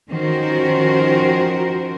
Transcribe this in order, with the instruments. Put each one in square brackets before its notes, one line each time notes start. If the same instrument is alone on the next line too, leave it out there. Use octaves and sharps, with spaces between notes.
[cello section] D#3 F3 C#4 F#4 A#4 C5